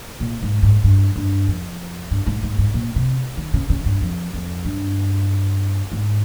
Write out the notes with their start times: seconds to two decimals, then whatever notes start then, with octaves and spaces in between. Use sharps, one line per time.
0.20 A#2
0.42 G#2
0.63 G#2
0.84 G2
1.16 G2
1.48 F2
2.11 G2
2.27 G#2
2.43 G#2
2.58 G#2
2.74 A#2
2.96 C3
3.37 D#3
3.54 C#3
3.70 C#3
3.85 G2
4.01 F2
4.34 F2
4.65 G2
5.92 G#2